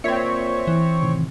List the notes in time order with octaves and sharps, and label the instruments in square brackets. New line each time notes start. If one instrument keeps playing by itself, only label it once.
[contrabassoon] A#2 [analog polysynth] C4 C#5 [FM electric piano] E5 B6
[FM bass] E3
[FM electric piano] A2 C3 D#3